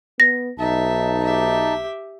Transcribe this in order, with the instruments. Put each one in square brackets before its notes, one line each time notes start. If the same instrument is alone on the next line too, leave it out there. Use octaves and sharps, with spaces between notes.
[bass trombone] B3 [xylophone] A#6
[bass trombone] B1 [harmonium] D#4 A5 [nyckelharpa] E5
[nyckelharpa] G4 E5